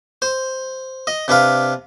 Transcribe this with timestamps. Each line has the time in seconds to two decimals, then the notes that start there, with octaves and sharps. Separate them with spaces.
0.22 C5
1.07 D#5
1.28 C3 D4 B4 F5